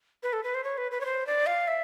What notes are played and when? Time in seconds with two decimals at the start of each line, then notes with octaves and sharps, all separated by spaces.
0.23 B4
0.33 A4
0.43 B4
0.54 C5
0.64 C#5
0.77 B4
0.91 B4
1.01 C#5
1.05 C5
1.27 D5
1.46 F5
1.68 E5